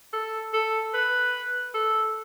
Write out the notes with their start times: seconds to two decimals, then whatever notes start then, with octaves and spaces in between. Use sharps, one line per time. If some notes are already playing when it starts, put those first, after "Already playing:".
0.13 A4
0.53 A4
0.94 B4
1.74 A4